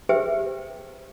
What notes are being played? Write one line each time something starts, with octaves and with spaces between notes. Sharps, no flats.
G4 G#4 B4 C5 E5 G5